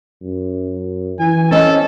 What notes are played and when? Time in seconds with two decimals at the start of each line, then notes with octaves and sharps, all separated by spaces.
0.23 F#2
1.19 E3 G#5
1.51 C#4 A4 D#5